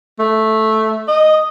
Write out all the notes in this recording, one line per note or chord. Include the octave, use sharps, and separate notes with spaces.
A3
D#5